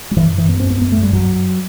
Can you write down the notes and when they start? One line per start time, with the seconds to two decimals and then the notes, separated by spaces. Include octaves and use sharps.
0.11 F#3
0.16 F#2 E3
0.32 F#2
0.38 E3
0.48 F#2 B3
0.60 C4
0.65 F#2
0.70 B3
0.81 F#2 B3
0.92 A3
0.97 F#2
1.03 G3
1.13 F#2 F#3
1.29 F#2